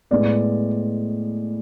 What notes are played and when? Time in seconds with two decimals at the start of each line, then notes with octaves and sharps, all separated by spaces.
0.11 A2 G#3 B3 D5